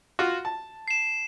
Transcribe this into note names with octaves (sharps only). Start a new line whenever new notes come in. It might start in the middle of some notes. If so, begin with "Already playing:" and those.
F4 F#4
A5
C7 E7